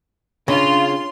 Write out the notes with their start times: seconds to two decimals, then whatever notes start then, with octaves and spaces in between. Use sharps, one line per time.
0.48 C#3 D4 F4 C6